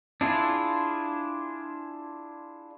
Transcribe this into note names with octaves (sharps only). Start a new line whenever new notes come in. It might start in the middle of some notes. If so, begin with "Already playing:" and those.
D4 E4 F4 G#4